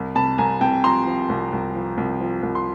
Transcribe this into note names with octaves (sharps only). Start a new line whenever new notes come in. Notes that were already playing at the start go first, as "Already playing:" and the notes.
Already playing: C2
C3 A5 B5
C2 G#5 A#5
C3 G5 A5
F3 A#5 C6
F3
C2
C2
F3
C2
F3
C2
C6